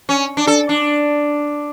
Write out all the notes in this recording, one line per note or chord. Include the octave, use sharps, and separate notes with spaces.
C#4
D4
A4
D4